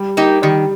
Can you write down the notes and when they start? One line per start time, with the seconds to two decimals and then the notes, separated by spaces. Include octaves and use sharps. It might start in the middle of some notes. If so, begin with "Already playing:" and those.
Already playing: G3
0.17 A#3 D#4 G4
0.42 D#3 G3